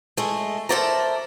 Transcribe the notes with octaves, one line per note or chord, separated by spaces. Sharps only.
G#3 A3
A4 A#4 C5 D5 E5 A#5